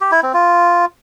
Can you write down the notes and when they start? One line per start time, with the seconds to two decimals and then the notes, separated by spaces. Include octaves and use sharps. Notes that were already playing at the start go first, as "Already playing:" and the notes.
0.01 G4
0.12 E4
0.23 C4
0.34 F4